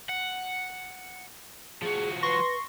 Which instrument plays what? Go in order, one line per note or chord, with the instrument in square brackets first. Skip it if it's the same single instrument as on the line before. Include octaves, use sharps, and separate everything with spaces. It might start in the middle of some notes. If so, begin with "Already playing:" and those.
[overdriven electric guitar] F#5
[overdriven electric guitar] F3 F#4 [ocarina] G#4
[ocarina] B4 [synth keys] C6 C#6 A#6